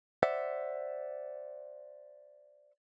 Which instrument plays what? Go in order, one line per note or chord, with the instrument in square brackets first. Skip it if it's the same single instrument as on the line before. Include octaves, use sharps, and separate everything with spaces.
[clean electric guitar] C5 D5 E5 F#5